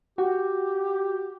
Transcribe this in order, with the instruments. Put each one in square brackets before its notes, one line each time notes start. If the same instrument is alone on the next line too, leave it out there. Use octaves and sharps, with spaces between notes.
[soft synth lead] F#4 [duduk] G4